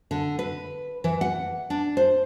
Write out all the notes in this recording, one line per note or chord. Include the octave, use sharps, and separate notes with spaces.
D3
B4
E3
F#5
D4
C5